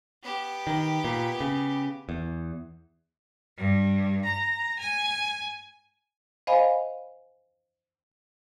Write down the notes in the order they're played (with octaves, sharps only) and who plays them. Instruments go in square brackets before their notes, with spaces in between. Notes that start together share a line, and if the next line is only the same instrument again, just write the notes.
[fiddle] B3 G4
[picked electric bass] D#3
A#2
C#3
E2
[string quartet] G2
A#5
G#5
[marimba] C5 D#5 F5 G#5 B5